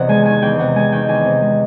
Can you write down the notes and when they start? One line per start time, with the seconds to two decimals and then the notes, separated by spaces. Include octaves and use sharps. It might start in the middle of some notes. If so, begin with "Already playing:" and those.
Already playing: E2 C3 D#3 D5 F#5
0.09 G#3 G#5
0.25 D#3 G#5
0.42 E2 G5
0.59 C3 F#5
0.75 G#3 G#5
0.92 D#3 G5
1.08 E2 G#5
1.26 C3
1.42 G#3